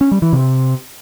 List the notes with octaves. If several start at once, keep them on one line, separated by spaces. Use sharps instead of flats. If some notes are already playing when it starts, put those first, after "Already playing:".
C#4
G3
E3
C3